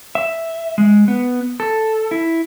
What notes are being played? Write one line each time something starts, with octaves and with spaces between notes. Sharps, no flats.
E5
G#3
B3
A4
E4